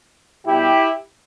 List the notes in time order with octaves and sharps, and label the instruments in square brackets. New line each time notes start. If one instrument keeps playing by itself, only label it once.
[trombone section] B2 G3 B3 E4 G4